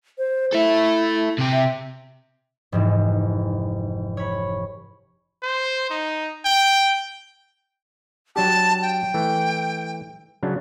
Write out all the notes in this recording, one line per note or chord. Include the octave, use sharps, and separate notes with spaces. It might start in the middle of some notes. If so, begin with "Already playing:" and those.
C5
E4 A4 E5
C3 G4
E5
F1 G#2 E3
C#5 B5
C5
D#4
G5
F#3 D4 G4 A5
G5
E3 A3
C#3 F#3 D4